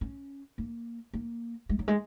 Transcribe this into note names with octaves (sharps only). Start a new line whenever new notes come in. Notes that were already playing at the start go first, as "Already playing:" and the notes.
C#4
A#3
A#3
G#3
F#3
G#3